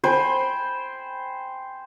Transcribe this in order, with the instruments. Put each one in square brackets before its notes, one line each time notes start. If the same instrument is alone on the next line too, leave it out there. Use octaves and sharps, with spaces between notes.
[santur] C5 G5 G#5 B5